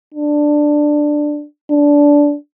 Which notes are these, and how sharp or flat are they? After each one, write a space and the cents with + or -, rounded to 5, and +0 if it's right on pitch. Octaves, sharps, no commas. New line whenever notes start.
D4 +10
D4 -15